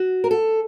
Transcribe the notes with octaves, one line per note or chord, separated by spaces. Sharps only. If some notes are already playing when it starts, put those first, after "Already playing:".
Already playing: F#4
A#4
A4